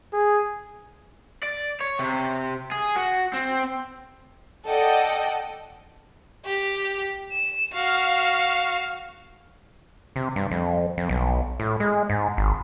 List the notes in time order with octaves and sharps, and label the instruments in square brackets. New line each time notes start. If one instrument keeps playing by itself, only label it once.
[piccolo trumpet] G#4
[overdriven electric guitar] D5
C#5
C3
G#4
F#4
C4
[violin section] A4 D5 D#5 F#5 G5
[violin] G4
E7
F#4 F5
[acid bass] C3
G2
F2
F2
B1
A2
G#3
G#2
G#1